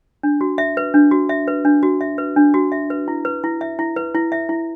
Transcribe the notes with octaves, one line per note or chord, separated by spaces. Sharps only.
D4
F#4
E5
B4
D4
F#4
E5
B4
D4
F#4
E5
B4
D4
F#4
E5
B4
E4
B4
E4
E5
E4
B4
E4
E5
E4